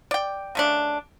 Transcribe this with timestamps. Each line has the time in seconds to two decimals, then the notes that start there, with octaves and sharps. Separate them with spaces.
0.11 D5 G5
0.55 C#3 A3 D4